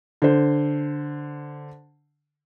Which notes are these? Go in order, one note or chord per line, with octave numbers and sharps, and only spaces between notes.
D3 C5